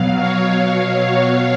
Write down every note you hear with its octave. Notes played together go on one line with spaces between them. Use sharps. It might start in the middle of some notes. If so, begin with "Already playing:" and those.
Already playing: B2 F#3 F5
C#5